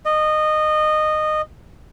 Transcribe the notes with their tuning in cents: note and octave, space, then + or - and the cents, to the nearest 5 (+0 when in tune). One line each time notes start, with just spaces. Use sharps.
D#5 -20